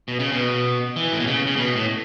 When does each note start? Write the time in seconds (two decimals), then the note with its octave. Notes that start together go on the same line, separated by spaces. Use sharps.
0.08 B2
0.19 C#3
0.32 B2
0.96 E3
1.13 A2
1.20 B2
1.27 C#3
1.47 C#3
1.56 B2
1.76 A2